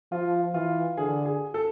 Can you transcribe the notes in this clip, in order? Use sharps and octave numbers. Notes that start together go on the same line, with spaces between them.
F3 F4
E3 F4
D3 G#4
G#4
A4